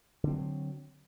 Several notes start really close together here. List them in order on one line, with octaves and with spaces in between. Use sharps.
D3 C4 F#3